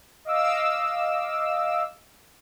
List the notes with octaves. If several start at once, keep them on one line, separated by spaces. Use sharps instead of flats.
D#5 F5 D6 E6